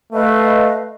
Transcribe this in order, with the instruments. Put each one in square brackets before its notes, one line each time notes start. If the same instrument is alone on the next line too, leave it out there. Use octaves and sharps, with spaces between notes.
[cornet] A3 [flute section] B4 D#5 F5